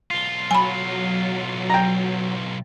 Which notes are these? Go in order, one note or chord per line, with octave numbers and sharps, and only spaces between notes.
B1 F4
F#3 G#5 B5
G5 A#5